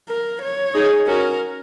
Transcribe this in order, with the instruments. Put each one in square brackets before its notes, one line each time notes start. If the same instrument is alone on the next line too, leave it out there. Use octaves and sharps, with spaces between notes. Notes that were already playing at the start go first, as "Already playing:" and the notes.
[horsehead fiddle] A#4
C#5
[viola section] D#4 G#4
[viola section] C#4 F#4 [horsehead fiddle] A#4